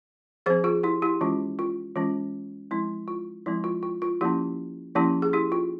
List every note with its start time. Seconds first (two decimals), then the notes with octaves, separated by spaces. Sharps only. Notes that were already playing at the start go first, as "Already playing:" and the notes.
0.46 F3 C4 G#4 C5
0.64 F4 G#4
0.83 E4 G4
1.02 E4 G4
1.21 E3 G#3 C#4 F4
1.59 F4
1.96 E3 G#3 C#4 F4
2.71 F3 G#3 C4 E4
3.08 F4
3.46 F3 G#3 C4 E4
3.64 F4
3.83 F4
4.02 F4
4.21 F3 A#3 C#4 E4 G4
4.95 F3 A#3 C#4 E4 G4
5.22 G#4
5.33 E4 G4
5.52 F4